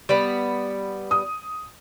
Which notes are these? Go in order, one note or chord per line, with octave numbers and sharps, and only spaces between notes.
G3 B3
D#6